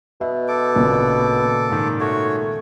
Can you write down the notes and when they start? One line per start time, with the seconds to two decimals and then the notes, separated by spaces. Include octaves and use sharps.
0.21 B2 D#5 E5
0.48 A4 D6
0.76 G#1 A#2 C#3
1.70 G#2 D#3
2.00 A3 F#4 C#5